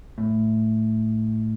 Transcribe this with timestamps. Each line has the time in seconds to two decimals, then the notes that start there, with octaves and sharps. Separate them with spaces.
0.18 A2